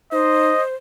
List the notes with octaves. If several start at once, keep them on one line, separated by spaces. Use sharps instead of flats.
D#4 C5 D#5